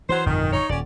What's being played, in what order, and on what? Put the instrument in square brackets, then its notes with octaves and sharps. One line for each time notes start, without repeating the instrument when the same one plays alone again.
[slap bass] E3 [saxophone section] F#3 C5
[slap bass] G1 F2 A#2 [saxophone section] D#3
[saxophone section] D#4 C#5
[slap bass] D#1 [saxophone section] C#4 D5